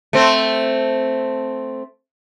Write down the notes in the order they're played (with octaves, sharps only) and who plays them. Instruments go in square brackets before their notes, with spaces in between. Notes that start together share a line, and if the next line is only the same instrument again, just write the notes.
[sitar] A3 C4